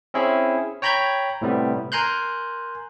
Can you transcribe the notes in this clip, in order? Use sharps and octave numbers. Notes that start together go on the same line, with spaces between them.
C4 C#4 E4 G#4
C#5 G5 A#5 B5 G6 G#6
A2 C3 G3 B3
A#4 G#5 A#5 C6 F#6 G6